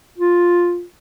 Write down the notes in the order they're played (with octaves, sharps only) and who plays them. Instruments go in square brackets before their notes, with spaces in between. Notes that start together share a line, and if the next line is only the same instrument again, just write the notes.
[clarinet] F4